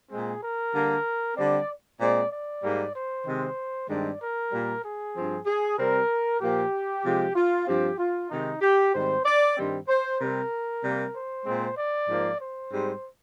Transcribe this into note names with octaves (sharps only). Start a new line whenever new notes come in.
A#2 G#3 C4 G#4
A#4
D3 G3 A#3
D3 G3 C4 D5
A#2 G#3 C4 D5
D5
G#2 G3 A#3
C5
C3 D#3 G#3 C4
G2 D#3 G#3 C4 D5
A#4
A#2 G3 A#3
G#4
G2 F3 C4
G#4
C3 G3 C4 A#4
A#2 F3 A#3 G4
C3 F3 G#3
F4
G2 F3 C4 G4
F4
C3 D#3 G#3 D#4
G4
G#2 D#3 G3 C4 C5
D5
G2 D#3 G3 C4
C5
C3 G3 C4 A#4
C3 G3 A#3
C5
A#2 G#3 C4
D5
G#2 F3 A#3
C5
G#2 G3 C4